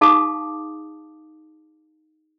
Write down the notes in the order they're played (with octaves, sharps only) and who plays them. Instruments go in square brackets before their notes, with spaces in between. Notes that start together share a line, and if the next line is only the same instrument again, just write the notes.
[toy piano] D#4 G#4 F5 A5 D6 D#6